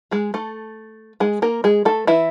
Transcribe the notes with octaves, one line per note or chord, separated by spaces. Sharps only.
G#3 G#4
A3 A4
G#3 G#4
A#3 A#4
G#3 G#4
A3 A4
E3 E4